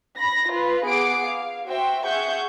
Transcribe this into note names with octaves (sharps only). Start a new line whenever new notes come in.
B5 A#6
F4 B4
B3 G#4 F#5 D6 C7 D7
F5
F#4 C5 E5 G5
G#4 E5 F#5 C#6 G6